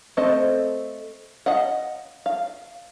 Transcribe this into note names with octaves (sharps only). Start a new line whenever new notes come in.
A3 C4 A4 C5 D#5
D#5 F5 F#5
F5